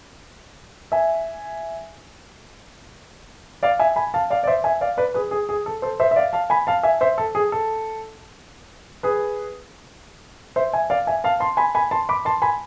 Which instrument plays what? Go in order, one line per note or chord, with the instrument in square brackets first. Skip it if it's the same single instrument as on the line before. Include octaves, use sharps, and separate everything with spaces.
[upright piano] E5 G#5
D5 F5
E5 G#5
G#5 B5
F5 A5
D5 F5
D5
C5 E5
E5 G#5
D5 F5
B4 D5
G#4 B4
G#4
G#4
A4
A4 C5
C5 E5
E5
D5 F5
F5 A5
G#5 B5
F5 A5
E5 G#5
C5 E5
A4
G#4
A4
G#4 B4
C5 E5
E5 G#5
D5 F5
E5 G#5
F5 A5
A5 C6
G#5 B5
G#5 B5
A5 C6
B5 D6
A5 C6
G#5 B5